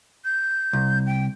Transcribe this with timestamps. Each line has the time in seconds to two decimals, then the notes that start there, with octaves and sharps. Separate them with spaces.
0.25 G6
0.73 C2
1.06 G5